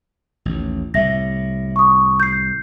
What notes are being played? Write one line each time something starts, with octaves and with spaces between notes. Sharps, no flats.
A1 D#2
C2 A2 E5 A#6
C#6 D#6
G6 C7